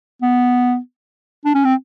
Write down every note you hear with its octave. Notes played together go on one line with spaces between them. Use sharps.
B3
D4
C#4
C4